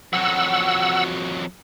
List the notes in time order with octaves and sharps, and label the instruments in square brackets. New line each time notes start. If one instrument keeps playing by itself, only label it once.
[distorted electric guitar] F2 F#3 [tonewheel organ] F#5 E6